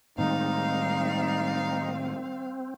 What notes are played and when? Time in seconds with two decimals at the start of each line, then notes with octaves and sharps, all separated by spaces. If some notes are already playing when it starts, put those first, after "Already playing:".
0.18 A2 D#3 G3 G#3 C4 D#4 F5